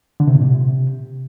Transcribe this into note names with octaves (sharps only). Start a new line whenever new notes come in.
D3
C3
A#2
C3